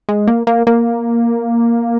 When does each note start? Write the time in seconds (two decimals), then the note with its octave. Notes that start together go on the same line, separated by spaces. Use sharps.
0.09 G#3
0.28 A#3
0.47 A#3
0.67 A#3